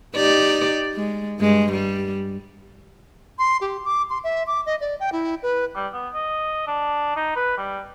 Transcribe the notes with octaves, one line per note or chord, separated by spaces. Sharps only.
D#4 G4 D5
G#3
G2 G#3
G3
C6
G4
D6
C6
E5
D6
D#5
D5
G5
E4
B4
G3
B3
D#5
D4
D#4
B4
G3